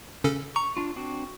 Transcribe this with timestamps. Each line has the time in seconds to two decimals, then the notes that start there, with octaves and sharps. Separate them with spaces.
0.24 C#3 C#4 A4
0.56 A#5 C#6
0.77 D4 F4
0.96 C4 D4 F#4